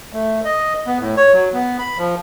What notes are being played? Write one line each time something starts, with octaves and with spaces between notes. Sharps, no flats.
A3
D#5
B3
A2
C#5
F#3
B3
B5
F3